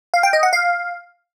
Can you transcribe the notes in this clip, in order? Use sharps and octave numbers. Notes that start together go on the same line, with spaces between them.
F5
G5
D#5
F#5
F5